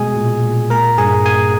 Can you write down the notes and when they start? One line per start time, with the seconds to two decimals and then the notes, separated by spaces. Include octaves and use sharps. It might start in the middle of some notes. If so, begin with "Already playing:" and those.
Already playing: B2 G#3 G#4 G#5
0.16 A#2
0.43 A#2
0.70 A#3 A#4 A#5
0.98 G2 G#4 G#5
1.25 A#3 G#4 G#5